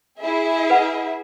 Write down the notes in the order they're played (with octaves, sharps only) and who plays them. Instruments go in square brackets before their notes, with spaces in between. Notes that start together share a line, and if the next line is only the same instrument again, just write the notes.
[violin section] E4 G#4 E5
[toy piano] B4 F#5